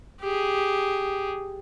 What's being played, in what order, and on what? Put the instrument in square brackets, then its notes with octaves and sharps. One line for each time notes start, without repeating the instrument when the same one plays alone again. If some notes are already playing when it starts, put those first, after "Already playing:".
[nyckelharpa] G4 G#4